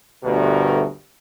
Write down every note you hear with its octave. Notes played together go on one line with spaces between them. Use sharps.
G1 D2 G2 B2 A3 A#4